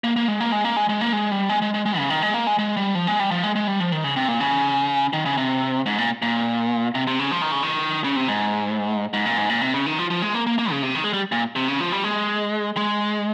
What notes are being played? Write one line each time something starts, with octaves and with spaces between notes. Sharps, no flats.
A#3
A#3
G#3
A#3
G#3
A#3
G#3
G#3
A#3
G#3
G3
G#3
G#3
G#3
G#3
C#3
D#3
G#3
A#3
G#3
G#3
G3
F3
G#3
G3
F3
G#3
G#3
G3
F3
D#3
C#3
C3
A#2
C#3
D#3
C#3
C3
G#2
A#2
A#2
C3
C3
C#3
F3
D#3
C#3
D#3
C#3
C3
G#2
G#2
A#2
G#2
A#2
C3
C#3
D#3
F3
F3
G#3
A#3
A#3
A#3
C#3
C3
D#3
G#3
G3
A#2
C3
C#3
F3
G3
G#3
G#3